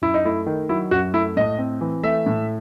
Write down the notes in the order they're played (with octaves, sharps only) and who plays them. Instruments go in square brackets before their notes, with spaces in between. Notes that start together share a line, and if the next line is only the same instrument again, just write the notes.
[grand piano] F#2 E4
D#4
A3 E4
D#3
F#3 E4
F#2 F#4
A3 E4
A2 D#5
C4
E3
A3 E5
A2